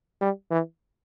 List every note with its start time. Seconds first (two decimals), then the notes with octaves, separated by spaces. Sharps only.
0.21 G3
0.51 E3